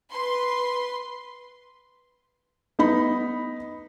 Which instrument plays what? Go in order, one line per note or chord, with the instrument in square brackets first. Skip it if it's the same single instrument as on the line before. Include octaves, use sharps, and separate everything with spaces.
[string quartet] B4 [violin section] C6
[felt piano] B3 D#4 B5